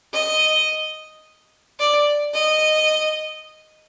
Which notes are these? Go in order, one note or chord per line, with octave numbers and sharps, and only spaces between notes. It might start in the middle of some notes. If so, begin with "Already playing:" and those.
D#5
D5
D#5